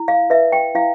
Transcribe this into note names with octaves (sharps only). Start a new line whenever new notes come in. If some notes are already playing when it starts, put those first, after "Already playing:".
Already playing: E4
F5
B4 E5
G5
E4 F5